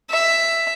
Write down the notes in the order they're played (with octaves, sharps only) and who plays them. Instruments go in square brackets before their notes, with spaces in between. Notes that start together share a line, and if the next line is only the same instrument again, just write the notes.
[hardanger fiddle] E5